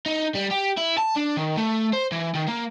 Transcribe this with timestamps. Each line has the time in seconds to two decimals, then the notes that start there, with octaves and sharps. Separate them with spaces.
0.06 D#4
0.35 G3
0.51 G4
0.78 E4
0.98 A5
1.17 D4
1.37 D#3
1.57 A3
1.93 C5
2.12 E3
2.35 D#3
2.48 A#3